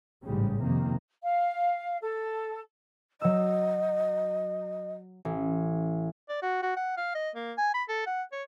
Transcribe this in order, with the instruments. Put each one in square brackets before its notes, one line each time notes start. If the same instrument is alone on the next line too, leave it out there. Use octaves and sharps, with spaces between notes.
[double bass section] A1 G#2 C#3 G3
F2 C3 D#3 A#3
[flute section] F5
A4
[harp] F#3 E6 [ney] D#5
[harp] A1
[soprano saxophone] D5
F#4
F#4
F#5
F5
D#5
A#3
G#5
B5
A4
F#5
C#5